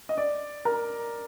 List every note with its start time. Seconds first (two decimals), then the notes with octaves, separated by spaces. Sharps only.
0.09 D#5
0.18 D5
0.65 A#4